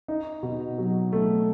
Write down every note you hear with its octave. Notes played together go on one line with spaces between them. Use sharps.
D#4
B2
F#3
A3